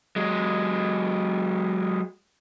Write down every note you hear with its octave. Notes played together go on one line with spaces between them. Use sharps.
F#3 G#3